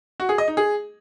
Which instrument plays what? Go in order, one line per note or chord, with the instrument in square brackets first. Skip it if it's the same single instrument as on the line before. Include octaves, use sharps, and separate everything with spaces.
[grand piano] F#4
G#4
D#5
D#4
G#4